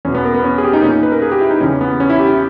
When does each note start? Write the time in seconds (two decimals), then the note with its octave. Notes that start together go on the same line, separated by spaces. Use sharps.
0.05 E2 B2 C#4
0.15 B3
0.24 A#4
0.34 B3
0.44 C#4
0.58 G#4
0.64 G4
0.73 D#4
0.83 A#2 C#4
0.92 D#4
1.03 B4
1.12 A#4
1.22 G#4
1.32 G4
1.41 E4
1.51 D#4
1.61 E2 C#3 E3 C#4
1.81 B3
2.00 C#4
2.10 E4
2.19 G4
2.29 E4